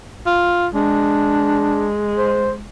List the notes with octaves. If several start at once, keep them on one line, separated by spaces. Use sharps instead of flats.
F4
G#3 D4
C5